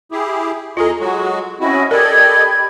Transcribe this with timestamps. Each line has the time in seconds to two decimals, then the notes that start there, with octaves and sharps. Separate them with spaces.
0.12 E4 G4 G#4
0.77 E2 F4 G#4 A4 D#5 A#5
1.00 F#3 G#3 F#4 G#4
1.60 C4 C#4 E4 F#4 D#5 B5
1.91 G4 A4 A#4 D5 D#5 B5 G#6